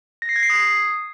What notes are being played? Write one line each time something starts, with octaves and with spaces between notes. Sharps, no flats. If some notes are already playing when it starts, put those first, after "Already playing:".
A#6
C7
G#6
C7
D#6